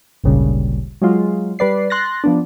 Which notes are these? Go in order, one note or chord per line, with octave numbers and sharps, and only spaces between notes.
G#1 D2 A#2 C#3 G3
F#3 G#3 F4
G3 B4 D5 C7
C6 F#6 A6 A#6
F3 B3 D4